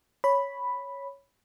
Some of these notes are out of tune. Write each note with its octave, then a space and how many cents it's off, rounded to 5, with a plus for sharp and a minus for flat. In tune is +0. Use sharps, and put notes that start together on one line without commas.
C#5 +0 B5 +0